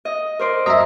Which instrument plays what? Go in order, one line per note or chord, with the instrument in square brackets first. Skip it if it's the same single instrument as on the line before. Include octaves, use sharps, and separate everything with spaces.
[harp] D#5
A#4 C5 D5
[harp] F#2 A#5 [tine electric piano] D#5 E5